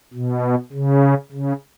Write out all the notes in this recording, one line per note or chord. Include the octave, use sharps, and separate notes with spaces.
B2
C#3
C#3